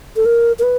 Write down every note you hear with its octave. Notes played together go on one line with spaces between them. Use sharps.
A4
A#4
A#4
B4